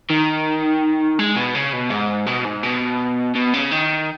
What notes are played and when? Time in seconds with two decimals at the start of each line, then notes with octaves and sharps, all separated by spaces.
0.10 D#3
1.19 G#3
1.36 B2
1.55 C#3
1.73 B2
1.90 G#2
2.26 B2
2.44 G#2
2.63 B2
3.35 B2
3.53 C#3
3.71 D#3